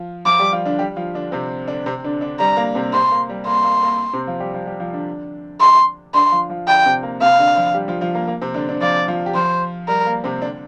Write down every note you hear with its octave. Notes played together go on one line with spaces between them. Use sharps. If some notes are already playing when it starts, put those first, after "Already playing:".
Already playing: F3 F4
F3 F4 D6
G3 G4
F3 F4
D3 D4
G3 G4
F3 F4
D3 D4
C3 C4
D3 D4
C3 C4
D3 D4
D3 D4
G3 A#5
A#3
C3 C4
C3 C4 C6
A#3
G3
A#3 C6
A#3
A#3
C3 C4
F3 F4
G3 G4
F3 F4
G3 G4
F3 F4
D3 D4
C6
D3 D4 C6
F3 F4
F3 F4
D3 D4 G5
C3 C4
A#3
C3 C4 F5
D3 D4
F3 F4
G3 G4
F3 F4
F3 F4
A#3
A#3
C3 C4
D3 D4
D3 D4
F3 F4 D5
F3 F4
G4
F3 F4 C5
G3 A#4
A#3
C3 C4
D3 D4